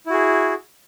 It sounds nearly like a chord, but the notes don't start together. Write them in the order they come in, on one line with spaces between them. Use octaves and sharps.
E4 F#4 G#4